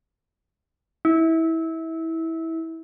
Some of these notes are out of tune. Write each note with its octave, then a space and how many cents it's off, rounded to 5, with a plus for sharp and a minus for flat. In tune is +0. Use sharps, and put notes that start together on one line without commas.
E4 -20